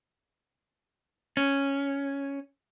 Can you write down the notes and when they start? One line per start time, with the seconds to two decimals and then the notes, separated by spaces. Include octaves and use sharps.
1.37 C#4